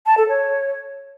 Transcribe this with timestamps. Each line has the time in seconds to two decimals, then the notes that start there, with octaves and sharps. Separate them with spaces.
0.06 A5
0.17 A4
0.29 C#5